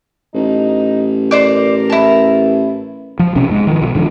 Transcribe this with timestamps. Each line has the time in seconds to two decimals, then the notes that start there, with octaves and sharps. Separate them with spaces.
0.35 A1 D#4
1.31 A#4 C5 D5 D6
1.90 E4 A5
3.19 F3
3.35 B1 C3 C#4
3.50 G#2 G#3
3.67 D#3 F3
3.82 B1
3.94 G#2 D3 D#3 F3